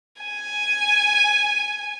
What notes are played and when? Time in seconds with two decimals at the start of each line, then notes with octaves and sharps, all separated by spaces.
0.23 G#5